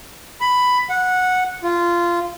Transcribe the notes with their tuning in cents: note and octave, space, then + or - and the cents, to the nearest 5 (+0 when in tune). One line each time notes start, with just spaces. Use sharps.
B5 +10
F#5 -10
F4 -15